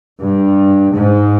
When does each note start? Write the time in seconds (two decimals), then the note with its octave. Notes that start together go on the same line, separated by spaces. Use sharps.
0.21 G2
0.94 G#2